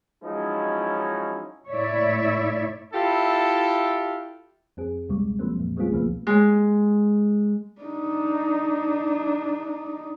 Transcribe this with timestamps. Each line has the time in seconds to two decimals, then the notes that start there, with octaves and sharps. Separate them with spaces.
0.23 F3 F#3 G#3 C#4 D#4 E4
1.71 A2 A3 E4 C#5 D5 E5
2.94 E4 F4 G4 A4
4.77 F2 C4 G#4
5.09 C#2 B2 G3 G#3
5.39 F3 F#3 A#3 C4
5.56 F2 A#2
5.77 G3 A3 B3 C4 F4 G#4
5.92 C#2 B2 D3 F3 A#3 B3
6.27 G#3
7.82 D4 D#4